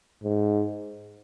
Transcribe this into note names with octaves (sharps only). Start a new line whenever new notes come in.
G#2